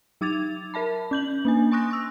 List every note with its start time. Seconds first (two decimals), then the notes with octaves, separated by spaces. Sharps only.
0.21 F#3 D#4 D6 G#6 A6 F7
0.74 A#4 E5 A5 B5
1.11 C#4 G6 F#7
1.45 A#3 D4 G#5
1.71 G#5 C6 C#6 D#6 F#6 A#6
1.91 C#6 E6